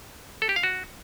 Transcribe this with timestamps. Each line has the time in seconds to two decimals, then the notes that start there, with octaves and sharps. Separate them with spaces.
0.42 A4
0.49 G4
0.56 F5
0.63 F#4